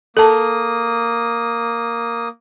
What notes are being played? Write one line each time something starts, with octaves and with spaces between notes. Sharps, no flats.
A#3 A4 A5 D#6